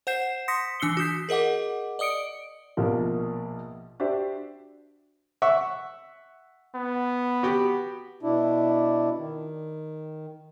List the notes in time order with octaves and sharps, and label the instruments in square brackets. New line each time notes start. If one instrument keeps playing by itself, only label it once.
[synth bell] C5 F#5 G6 C7 E7
C6 D#6 A#6 B6 C#7
E3 D4 E6 C7 C#7 G7
F#4 D#6 G6 B6
G#4 A#4 D#5 F#5 D6
D5 D#5 D#6 C#7 D7
[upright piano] A#1 B2 F3 A#3
D4 F#4 G4 C5 E5
[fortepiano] E5 F#5 C#6
[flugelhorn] B3
[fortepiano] F#4 G4
[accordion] B2 D4 E4
D#3